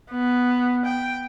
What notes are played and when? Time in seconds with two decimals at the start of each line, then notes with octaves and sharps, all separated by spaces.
0.11 B3
0.85 G5